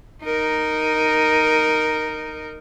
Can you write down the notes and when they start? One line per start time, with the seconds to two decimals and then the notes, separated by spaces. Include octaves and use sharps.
0.25 D#4 A#4